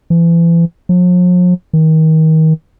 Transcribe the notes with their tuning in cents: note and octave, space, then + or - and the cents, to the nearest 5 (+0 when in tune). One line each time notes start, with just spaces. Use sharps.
E3 +35
F3 +45
D#3 +30